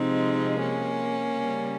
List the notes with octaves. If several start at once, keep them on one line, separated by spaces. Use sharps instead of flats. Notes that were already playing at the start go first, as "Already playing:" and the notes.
Already playing: C3 F3 G#3 C4 D#4
A#3 C#4
C#3 G3